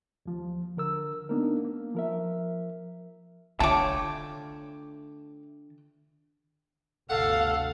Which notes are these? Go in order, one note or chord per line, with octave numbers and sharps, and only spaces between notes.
D#2 F3
D3 A#4 E6
A#3 B3 D4 D#4 A#4
A#3
F3 A#4 E5
D3 A3 F4 C#5 G5 A5 D6
G1 D2 C3 A4 F5 F#5